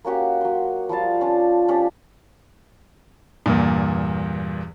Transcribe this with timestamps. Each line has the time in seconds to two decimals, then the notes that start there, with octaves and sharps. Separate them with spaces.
0.05 A#3 C#4 F#4 G4
0.41 F#3 C6
0.89 F3 G3 F5 A5
1.21 C#4 D4 F4
1.68 F3 C#4 D4 G4
3.46 E2 G2 A#2